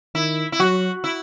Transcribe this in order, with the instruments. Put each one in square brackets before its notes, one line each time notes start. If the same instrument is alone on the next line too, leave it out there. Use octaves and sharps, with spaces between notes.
[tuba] D#3 [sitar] E4
[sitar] E4
[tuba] F#3 [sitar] F#4
[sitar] E4